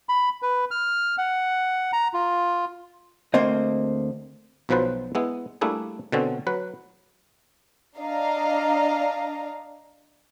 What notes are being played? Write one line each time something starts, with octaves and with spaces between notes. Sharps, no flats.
B5
B4
F6
F#5
A#5
F4
D2 A3 A#3 C4 C5 D#5
B1 B2 F3 F#3 B4 C5
G#3 B3 E4
G3 A3 A#3 D4 E4 G#4
B2 D3 C4 C#4
F#3 B4
D4 D5 D#5 F5 A#5